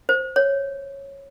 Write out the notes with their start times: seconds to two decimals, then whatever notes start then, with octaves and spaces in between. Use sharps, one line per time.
0.09 C5
0.36 C#5